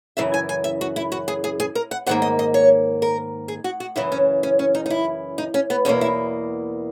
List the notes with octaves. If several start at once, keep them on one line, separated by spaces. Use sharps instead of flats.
F#2 C#3 E3 E5
G#5
G#5
E5
F#4
E4
F#4
G#4
G#4
G#4
A#4
F#5
G#2 D#3 A#3 F#5
D#5
D#5
C#5
A#4
G#4
F#4
F#4
F#2 C#3 E3 E4
C#4
C#4
C#4
D#4
D#4
E4
D#4
C#4
B3
E2 B2 A#3 C#4
E4